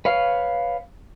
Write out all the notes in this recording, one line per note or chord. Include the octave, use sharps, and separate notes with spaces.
B4 C#5 F5